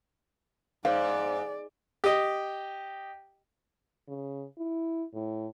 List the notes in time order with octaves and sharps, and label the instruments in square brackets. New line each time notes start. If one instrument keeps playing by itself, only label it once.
[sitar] G#2 [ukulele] C5 F5 [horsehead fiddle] D5
[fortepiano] G4 D#5
[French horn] C#3
E4
A2